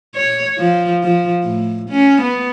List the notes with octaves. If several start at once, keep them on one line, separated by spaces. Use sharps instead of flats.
C#5
F3
F3
A2
C#4
B3